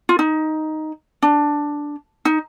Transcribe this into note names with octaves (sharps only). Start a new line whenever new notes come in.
F4
D#4
D4
D#4